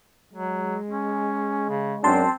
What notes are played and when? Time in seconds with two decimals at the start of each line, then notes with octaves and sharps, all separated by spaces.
0.33 F#3 G#3
0.90 C#4
1.69 C#3
2.04 F#2 C4 D4 A5 C6